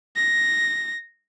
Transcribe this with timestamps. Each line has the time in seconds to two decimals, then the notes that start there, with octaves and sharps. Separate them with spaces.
0.16 A#6